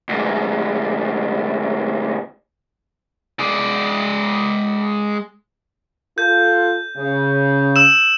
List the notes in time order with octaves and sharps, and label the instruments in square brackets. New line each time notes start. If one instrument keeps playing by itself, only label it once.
[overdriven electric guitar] D2 G#2
[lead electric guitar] G#3 D5
[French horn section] F4 A4 [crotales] G6
[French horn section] C#3
[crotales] E6 E7